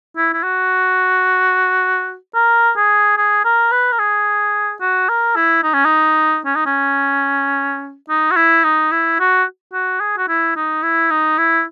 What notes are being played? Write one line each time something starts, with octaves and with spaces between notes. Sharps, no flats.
E4
E4
F#4
A#4
G#4
G#4
A#4
B4
A#4
G#4
F#4
A#4
E4
D#4
C#4
D#4
C#4
D#4
C#4
D#4
F#4
E4
D#4
E4
F#4
F#4
G#4
F#4
E4
D#4
E4
D#4
E4